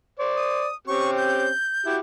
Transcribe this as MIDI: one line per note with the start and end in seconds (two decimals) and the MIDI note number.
0.19 0.67 72
0.19 0.67 74
0.36 0.75 87
0.87 1.49 60
0.87 1.49 61
0.87 1.49 67
0.87 1.11 85
1.17 1.96 91
1.86 2.00 64
1.86 2.00 66
1.86 2.00 67